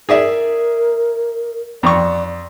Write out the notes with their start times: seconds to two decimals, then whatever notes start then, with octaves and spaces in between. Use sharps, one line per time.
0.09 G#4 A#4 D5 E5
1.83 F2 D5 C#6